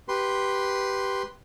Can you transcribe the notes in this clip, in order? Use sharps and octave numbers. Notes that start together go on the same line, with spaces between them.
G4 B4 C6